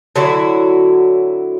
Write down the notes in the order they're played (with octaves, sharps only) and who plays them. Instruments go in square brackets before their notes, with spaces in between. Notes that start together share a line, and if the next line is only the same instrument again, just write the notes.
[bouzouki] D3 F#3 E4 F#4